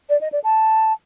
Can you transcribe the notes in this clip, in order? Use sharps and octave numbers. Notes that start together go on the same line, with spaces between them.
D5
D#5
D5
A5